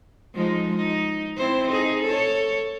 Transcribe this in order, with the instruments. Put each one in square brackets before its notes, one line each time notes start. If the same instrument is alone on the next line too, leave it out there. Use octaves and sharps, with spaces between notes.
[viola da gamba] F3 G#3 D#4
D#4
C4 E4 C5
D#4 G#4
A4 C#5